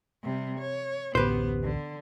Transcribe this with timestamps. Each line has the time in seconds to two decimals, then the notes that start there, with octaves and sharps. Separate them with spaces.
0.24 C3 G3
0.58 C#5
1.15 D1 A1 D2 B3 G4 B4 C5
1.64 D3